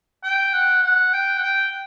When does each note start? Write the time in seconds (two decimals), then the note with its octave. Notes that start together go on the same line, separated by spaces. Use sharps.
0.24 G5
0.54 F#5
0.83 F#5
1.13 G5
1.38 F#5
1.43 G5